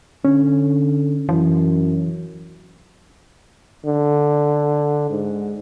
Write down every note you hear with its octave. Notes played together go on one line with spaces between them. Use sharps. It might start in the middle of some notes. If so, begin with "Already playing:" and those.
D3 C#4
F#2 E3
D3
G#2